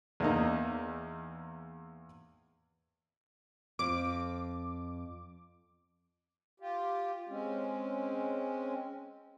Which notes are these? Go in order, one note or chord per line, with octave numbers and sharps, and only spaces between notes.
E2 A#3 D#4
F2 D6
F4 G4
G#3 C4 C#4